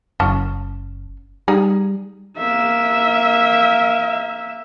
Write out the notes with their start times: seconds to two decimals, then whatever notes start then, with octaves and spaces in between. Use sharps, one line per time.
0.20 F#1 C#4 A5
1.48 G3 D#4 G#4
2.38 A#3 E5